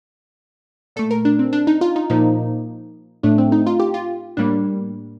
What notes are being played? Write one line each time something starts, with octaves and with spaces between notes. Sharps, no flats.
A#2 A3 A4
A#4
D4
C4
D4
D#4
F4
D#4
A#2 F3 A#3 D#4
A2 A3 D4
C4
D#4
F4
G4
F4
A2 G3 A#3 D4